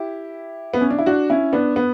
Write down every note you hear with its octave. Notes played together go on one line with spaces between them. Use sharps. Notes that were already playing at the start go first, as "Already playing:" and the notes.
Already playing: E4 G4
B3
C#4
D4
E4
D4 F#4
C#4 E4
B3 D4
B3